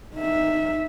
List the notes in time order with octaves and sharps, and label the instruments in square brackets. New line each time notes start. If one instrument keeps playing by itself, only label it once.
[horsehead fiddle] D#4 E5